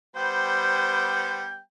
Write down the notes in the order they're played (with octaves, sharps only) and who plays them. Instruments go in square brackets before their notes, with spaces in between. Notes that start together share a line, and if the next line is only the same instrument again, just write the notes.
[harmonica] G3 B3 [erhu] C5 [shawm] G5